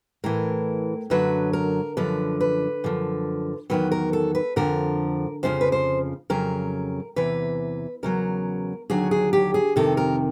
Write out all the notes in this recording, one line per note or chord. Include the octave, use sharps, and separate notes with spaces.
A2 E3 A#4
F#2 D3 F#3 B4
A#4
F#2 D3 F3 B4
B4
F#2 D3 F3
E2 C3 D#3 F#3 B4
A#4
A4
B4
F2 D3 F3 A#4
F2 C#3 F3 C5
B4
C5
F2 C#3 F#3 A#4
E2 C3 E3 B4
E2 C#3 F#3 A#4
D#2 D3 F#3 G#4
G#4
G4
G#4
F2 C3 D#3 A4
A#4